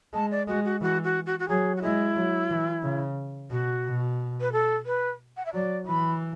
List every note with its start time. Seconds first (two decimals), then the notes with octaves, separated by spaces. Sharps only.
0.13 G#3 A5
0.30 D5
0.47 G#3 F#4
0.64 F#4
0.81 E3 F#4
1.03 F#4
1.26 F#4
1.39 F#4
1.48 F#3 G#4
1.76 F#4
1.82 G#3 E4
2.16 F#3
2.50 E3
2.83 C#3
3.50 B2 F#4
3.85 B2
4.40 B4
4.52 A4
4.85 B4
5.36 F#5
5.45 E5
5.53 F#3 D5
5.87 E3 B5